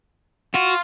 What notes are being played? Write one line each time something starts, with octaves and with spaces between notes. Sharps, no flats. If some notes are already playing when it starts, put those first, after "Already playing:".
F4 F#4